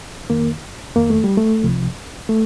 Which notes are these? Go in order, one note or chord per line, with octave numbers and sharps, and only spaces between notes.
F2 D#3 A#3
F2 D#3 A#3
A3
G3
A3
C2 C3 F3
A3